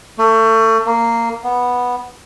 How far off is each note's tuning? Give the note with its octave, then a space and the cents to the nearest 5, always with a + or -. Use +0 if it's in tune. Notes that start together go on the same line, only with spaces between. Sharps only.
A3 +30
A#3 -10
B3 -5